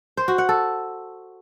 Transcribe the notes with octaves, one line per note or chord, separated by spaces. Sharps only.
C5
F#4
F#5
A4